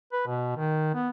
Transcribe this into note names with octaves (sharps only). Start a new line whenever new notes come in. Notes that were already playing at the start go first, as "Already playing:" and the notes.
B4
B2
D#3
B3